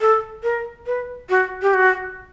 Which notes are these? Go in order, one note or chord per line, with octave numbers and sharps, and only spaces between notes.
A4
A#4
B4
F#4
G4
F#4